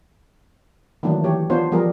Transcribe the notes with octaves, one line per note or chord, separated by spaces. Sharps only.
D#3 E3 F#3 A3 A#3 D4
E3 G4 C#5
B3 D4 F4 C5 C#5
F3 G3 B3 G#4 A#4